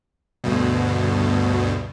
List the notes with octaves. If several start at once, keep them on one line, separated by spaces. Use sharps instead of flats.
D2 G2 B2